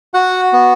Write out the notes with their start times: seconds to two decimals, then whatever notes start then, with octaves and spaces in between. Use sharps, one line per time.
0.14 F#4 F#5
0.53 B3